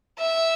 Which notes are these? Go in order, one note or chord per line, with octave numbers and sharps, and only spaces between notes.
E5